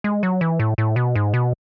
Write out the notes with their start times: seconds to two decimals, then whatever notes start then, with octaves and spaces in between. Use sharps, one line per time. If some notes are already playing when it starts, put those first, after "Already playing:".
0.04 G#3
0.23 F#3
0.41 E3
0.60 A2
0.78 A2
0.96 B2
1.15 G#2
1.34 B2